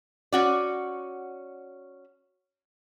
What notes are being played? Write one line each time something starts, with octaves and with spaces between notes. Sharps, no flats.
C#4 F#4 D5